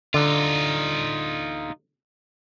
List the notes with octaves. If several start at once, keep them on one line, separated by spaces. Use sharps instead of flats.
D3 D#4 F4